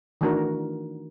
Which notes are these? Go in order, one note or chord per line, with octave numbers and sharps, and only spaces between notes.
D#3 E3 A3 D4 F#4 A#4